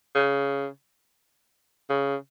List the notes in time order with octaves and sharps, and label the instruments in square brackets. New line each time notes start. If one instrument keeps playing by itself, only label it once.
[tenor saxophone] C#3
C#3